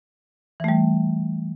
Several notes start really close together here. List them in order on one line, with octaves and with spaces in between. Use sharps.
E3 A3 G3